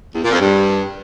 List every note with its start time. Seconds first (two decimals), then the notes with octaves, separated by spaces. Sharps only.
0.14 E2
0.23 A#2
0.31 F2
0.39 G2